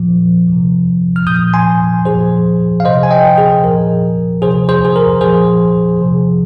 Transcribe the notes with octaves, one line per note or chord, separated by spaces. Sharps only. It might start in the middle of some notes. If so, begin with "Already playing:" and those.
Already playing: A#2 F3
C3 F3
F6
A#2 F3 D#6 G6
G#5 C6
A#2 F3 G#4 C5
F5
C3 F3 C5 D#5
G#5
D#5 G5
G#4
A#2 F3 A#4
C3 F3 G#4 C5
G#4 C5
G#4
A#4
A#2 F3 G#4 C5
C3 F3